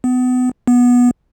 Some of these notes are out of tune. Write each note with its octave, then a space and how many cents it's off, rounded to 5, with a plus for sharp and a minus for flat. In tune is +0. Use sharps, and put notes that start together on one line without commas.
B3 +30
B3 -15